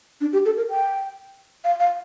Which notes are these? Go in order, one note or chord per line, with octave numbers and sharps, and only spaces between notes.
D4
G4
A4
A#4
G5
F5
F5